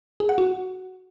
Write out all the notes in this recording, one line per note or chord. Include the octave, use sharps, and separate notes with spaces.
G#4
F#5
F#4